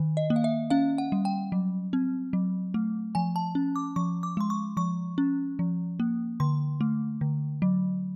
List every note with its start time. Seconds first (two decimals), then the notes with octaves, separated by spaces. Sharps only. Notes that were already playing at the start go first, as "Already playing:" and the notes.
Already playing: D#3
0.17 D#5
0.30 A#3
0.36 F5
0.44 E5
0.70 C#4 F5
0.98 F#5
1.12 G3
1.25 G5
1.52 F#3
1.93 C4
2.33 F#3
2.74 A3
3.15 F3 G#5
3.36 A5
3.55 C#4
3.76 D6
3.96 F3 C#6
4.23 D6
4.37 G#3 C6
4.50 C#6
4.77 F3 C#6
5.18 C#4
5.59 F3
6.00 A#3
6.40 D3 C6
6.81 A3
7.21 D3
7.62 F#3